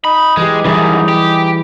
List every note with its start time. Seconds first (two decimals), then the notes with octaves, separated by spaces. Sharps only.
0.05 D#4 B5
0.37 E3 G#3 G4
0.65 F#2 D#3 E3 G3 D#4 E4 G#4
1.09 G4